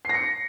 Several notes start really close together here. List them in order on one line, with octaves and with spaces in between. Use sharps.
C7 A#6 C#7